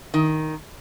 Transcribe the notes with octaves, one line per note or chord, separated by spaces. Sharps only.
D#3